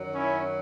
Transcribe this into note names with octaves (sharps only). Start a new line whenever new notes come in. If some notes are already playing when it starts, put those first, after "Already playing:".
Already playing: F#2 D#3 F#3
C#4 E4